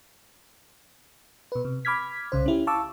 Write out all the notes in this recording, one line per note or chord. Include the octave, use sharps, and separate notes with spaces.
B2 B4
C3
B5 D6 F6 G#6 B6
C2 C#3 C5
C#4 E4 G4
F5 A5 C#6 D6 E6